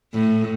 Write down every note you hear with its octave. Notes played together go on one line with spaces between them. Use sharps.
A2